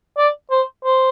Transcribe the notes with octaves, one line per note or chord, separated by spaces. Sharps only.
D5
C5
C5